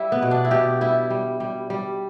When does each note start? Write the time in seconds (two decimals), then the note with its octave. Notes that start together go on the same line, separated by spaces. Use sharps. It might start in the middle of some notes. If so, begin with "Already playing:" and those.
Already playing: G3 E4
0.12 B3
0.22 B2
0.31 D4
0.45 E4
0.51 B2 G4
0.81 G3 E4
1.10 G3
1.40 G3
1.70 G3